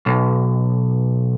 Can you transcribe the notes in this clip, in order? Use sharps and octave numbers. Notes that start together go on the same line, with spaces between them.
B1